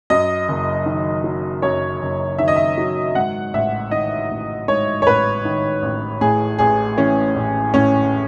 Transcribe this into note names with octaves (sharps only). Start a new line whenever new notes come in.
F#2 D#5
F#1
D#3
F#3
F#2 C#5
F#1
D#3 E5
D#5
E5
F#3
G#2 F#5
A1 E5
D#3 D#5
A1
G#2 C#5
C#5
A1 B4
D#3
A1
A2 G#4
A1 G#4
E3 C#4
A1
A2 C#4